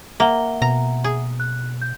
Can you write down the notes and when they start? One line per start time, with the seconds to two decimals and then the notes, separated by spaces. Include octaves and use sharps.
0.20 A#3 E5 F#5 G7
0.62 B2 A#5
1.04 G#4
1.40 F#6
1.82 G6